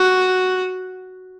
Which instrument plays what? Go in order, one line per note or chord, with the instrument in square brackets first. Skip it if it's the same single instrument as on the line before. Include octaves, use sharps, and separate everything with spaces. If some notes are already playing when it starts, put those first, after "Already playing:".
Already playing: [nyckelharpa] F#4